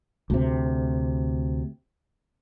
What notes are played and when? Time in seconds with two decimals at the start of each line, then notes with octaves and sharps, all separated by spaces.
0.30 D2 C3